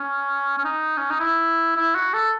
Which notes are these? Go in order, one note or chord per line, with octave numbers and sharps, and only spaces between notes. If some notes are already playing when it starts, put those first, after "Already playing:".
Already playing: C#4
C#4
D#4
C#4
D#4
E4
E4
F#4
A4